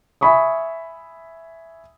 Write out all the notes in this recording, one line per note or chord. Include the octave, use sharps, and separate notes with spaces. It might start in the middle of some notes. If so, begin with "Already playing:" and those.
E5 G#5 B5 C#6 D#6